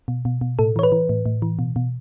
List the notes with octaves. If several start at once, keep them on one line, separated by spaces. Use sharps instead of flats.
B2
B2
B2
A2 A4
E3 C#5
B4
E3
A2
A2
E3
B2
B2